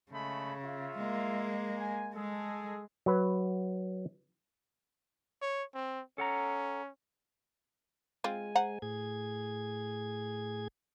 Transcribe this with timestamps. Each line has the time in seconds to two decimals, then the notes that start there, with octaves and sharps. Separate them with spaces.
0.12 C#3 G#3 A3 B5
0.63 F4 E5
0.98 G#3 A#3
1.77 G#5
2.15 G#3 G#4 A4
3.06 F#3 B4
5.42 C#5
5.74 C4
6.18 C#4 A4 F#5 A#5
8.24 G#3 C4 F4 G#5
8.55 C5 F#5 A#5
8.82 A2 G#4 G#6